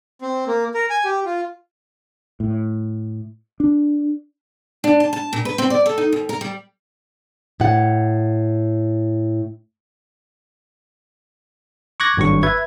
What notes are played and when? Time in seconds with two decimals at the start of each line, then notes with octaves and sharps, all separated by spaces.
0.21 C4
0.47 A#3
0.74 A#4
0.90 G#5
1.05 G4
1.25 F4
2.40 A2
3.60 D4
4.84 D4
5.00 A5
5.13 A5
5.33 A#2
5.45 B4
5.58 C4
5.70 D5
5.86 A4
5.98 D#4
6.13 D#2
6.29 A#4
6.41 G3
7.60 A2 F#5
12.00 C#6 D6 F#6 G#6 A#6
12.17 G#1 G2 F#3 C#6
12.43 B4 E5 G#6